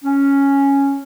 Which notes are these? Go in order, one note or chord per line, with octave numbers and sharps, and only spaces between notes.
C#4